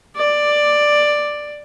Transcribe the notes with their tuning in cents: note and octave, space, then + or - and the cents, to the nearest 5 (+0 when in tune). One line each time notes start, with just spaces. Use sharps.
D5 +5